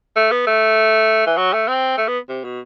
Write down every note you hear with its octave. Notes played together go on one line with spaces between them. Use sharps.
A3
B3
A3
E3
F#3
A3
C4
A3
B3
C3
B2